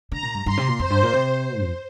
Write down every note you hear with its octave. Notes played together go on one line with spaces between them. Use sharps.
D3 A#5
A#2
G2
G2 C6
C3
A#2
F2 C5
G2
A#2
C3
F2